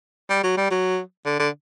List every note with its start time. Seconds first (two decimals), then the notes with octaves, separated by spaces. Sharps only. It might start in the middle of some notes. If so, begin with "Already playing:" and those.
0.29 G3
0.43 F#3
0.57 G3
0.71 F#3
1.26 D3
1.39 D3